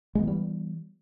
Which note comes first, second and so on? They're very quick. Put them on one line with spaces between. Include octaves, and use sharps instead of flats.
G#3 B3 E3 G3